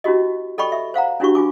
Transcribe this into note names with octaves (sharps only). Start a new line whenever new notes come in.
C#4 E4 F#4 G4 D#5
A4 D5 D#5 G5 B5 C#6
E5
C5 F5 F#5 A#5
C#4 D4 E4 F#4 G4 C#6
F4 G#5 D6